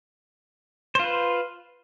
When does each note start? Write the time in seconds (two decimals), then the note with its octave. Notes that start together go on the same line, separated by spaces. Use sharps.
0.95 C5
1.00 F4
1.04 B4